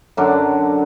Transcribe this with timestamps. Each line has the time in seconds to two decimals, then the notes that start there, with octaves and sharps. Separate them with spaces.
0.17 F#2 D3 F#3 D4